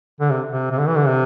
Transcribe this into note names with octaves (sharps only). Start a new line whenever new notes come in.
D3
C3
C3
C3
D3
E3
D3
C3